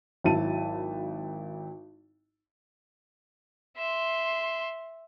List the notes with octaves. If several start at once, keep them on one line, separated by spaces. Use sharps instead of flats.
G#1 F#3 E4 A5 D#7
E5 C6